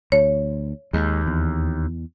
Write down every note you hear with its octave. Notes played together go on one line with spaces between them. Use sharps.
D2 C#5
D#2 G#3
E2